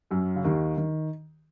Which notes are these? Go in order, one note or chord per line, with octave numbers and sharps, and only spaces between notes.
F#2 F#3
C#3
D#2 D#3
D#3